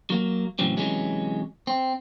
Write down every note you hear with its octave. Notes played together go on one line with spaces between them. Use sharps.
F#3 A#3
A2 C#3 E3 F#3 C4
C3 E3 F#3 G#3 C#4
C4